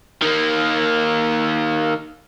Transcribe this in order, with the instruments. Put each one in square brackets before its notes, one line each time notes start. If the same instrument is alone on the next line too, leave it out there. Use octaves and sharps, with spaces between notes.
[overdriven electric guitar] D#3 A#3